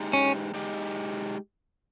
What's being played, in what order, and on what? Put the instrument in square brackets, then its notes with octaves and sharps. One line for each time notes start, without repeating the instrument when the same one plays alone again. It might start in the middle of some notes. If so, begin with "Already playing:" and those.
Already playing: [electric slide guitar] G#3 D#4 G4
[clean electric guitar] C#4
[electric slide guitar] G#3 D#4 G4